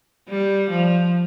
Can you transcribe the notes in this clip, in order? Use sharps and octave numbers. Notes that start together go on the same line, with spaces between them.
G3
F3